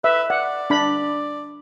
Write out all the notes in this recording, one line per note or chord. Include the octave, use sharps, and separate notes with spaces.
B4 E5
D5 F#5
D4 B5